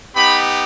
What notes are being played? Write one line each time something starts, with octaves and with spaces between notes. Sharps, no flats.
B3 D#4 G4 B5